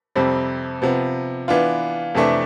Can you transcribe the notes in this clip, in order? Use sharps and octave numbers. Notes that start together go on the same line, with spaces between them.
F2 C3 G3 C4
C3 F3 B3
E3 B3 D4 F4
F2 C3 E3 A3 D4